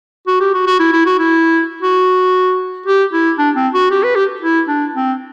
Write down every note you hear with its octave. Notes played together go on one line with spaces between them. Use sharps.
F#4
G4
F#4
F#4
E4
E4
F#4
E4
F#4
G4
E4
D4
C4
F#4
G4
B4
G4
E4
D4
C4